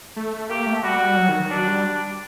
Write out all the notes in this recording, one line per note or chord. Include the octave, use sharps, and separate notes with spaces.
A3
A#3 G4
A3
G3 F#4
F#3
D#3
D#3
F#3 D4
G3